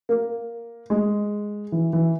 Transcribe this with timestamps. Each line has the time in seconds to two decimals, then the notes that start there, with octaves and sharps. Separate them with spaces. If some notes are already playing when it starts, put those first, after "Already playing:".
0.09 A#3
0.90 G#3
1.72 E3
1.93 E3